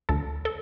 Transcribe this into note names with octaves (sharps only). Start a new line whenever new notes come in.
D2 A4
A4